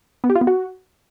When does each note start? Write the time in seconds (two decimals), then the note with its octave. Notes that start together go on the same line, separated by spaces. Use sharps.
0.24 B3
0.30 G4
0.35 F4
0.41 B3
0.47 F#4